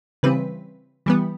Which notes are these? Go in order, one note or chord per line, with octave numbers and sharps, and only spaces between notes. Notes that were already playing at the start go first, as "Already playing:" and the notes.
C#3 E3 G3 C4 B4
E3 G3 B3